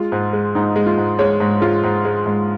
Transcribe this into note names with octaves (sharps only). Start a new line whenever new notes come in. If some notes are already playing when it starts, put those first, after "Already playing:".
Already playing: G#3 F4
G#2
G#3
G#2 D#4
G#3
F4
G#2
G#3 C#5
G#2
G#3 F4
G#2
G#3
G#2